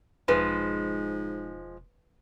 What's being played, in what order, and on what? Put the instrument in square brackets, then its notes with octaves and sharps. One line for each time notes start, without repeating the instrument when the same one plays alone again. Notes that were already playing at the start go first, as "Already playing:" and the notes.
[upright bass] E1 [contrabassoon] G#2 [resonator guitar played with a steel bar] F3 G#3 [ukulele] B4